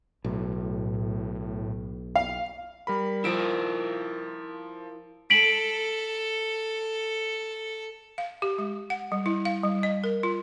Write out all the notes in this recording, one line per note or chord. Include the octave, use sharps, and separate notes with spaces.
B1 A2
F5
G3 A#4 B5
F3 E4 F4 A#4 D7 E7
A4 B6 D7 F#7
F5
G4
G#3
F#5
G3
E4
F5
G3
D#5
A#4
F4